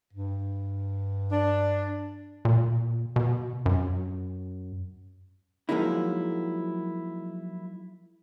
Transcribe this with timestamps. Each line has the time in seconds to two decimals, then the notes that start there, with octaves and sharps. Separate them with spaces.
0.13 G2
1.32 D4
2.45 A#2
3.16 B2
3.66 F#2
5.69 F3 F#3 G#3 A#3 D#4 E4